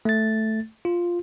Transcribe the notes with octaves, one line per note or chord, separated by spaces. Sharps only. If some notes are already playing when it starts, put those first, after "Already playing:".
A3 A6
F4